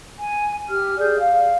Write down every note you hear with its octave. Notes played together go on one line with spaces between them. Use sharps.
G#5
G4 F6
G#4 D5 G6
F5